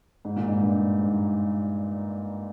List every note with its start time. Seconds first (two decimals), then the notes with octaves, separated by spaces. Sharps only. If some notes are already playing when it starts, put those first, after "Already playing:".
0.25 G#2
0.36 A#2
0.48 G#2
0.62 G2
0.99 G#2